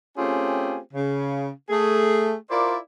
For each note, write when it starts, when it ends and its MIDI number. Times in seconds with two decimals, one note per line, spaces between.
0.18 0.78 57
0.18 0.78 60
0.18 0.78 61
0.18 0.78 65
0.18 0.78 67
0.18 0.78 68
0.94 1.49 49
1.70 2.34 57
1.70 2.34 68
2.50 2.76 64
2.50 2.76 65
2.50 2.76 70
2.50 2.76 72
2.50 2.76 74